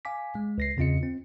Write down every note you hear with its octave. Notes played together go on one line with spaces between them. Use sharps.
F5 G#5 D6 B6
G#3
C#2 A#6 C7
E2 C#3 C4 F4 D#5 C#7
C4